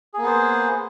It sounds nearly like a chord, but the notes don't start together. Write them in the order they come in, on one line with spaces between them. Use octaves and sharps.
G#4 A#3 B3 C5